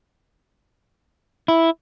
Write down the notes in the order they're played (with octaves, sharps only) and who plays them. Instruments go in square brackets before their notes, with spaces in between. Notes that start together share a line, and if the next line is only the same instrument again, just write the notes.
[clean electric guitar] E4